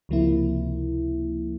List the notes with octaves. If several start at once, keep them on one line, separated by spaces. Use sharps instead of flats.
C#2 C3 F3 A#3 E4